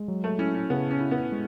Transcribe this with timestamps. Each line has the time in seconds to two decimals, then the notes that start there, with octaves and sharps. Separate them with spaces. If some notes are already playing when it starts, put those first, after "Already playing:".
Already playing: G#3
0.08 F#3
0.24 A3
0.39 C#4 E4
0.55 C#4
0.70 C#3 B3
0.91 C#4
1.00 E4
1.11 B3
1.32 G#3